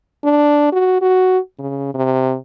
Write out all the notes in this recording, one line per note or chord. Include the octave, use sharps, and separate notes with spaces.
D4
F#4
F#4
C#3
C3